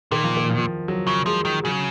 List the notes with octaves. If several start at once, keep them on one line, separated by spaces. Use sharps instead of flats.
A#2 D#3
F3
D#3
F3
F#3
C#3
F3 G#3
D#3
C#3 F#3